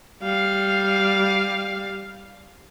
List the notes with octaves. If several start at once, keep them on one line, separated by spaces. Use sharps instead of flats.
G3 F5